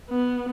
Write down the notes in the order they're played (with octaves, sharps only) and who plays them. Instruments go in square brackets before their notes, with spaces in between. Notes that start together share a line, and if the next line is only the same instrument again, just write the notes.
[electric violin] B3